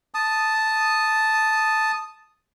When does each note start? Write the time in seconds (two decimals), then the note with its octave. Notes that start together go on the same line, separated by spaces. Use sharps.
0.14 A5 D#6